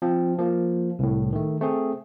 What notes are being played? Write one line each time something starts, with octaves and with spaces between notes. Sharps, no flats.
F3 C4
F3 A#3
C2 A2
D#3 A3
A3 C4 G#4